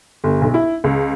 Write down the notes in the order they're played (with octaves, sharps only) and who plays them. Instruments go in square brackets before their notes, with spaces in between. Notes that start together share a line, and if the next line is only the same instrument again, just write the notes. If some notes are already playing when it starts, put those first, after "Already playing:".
[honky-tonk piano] G1
B1
E4
C#2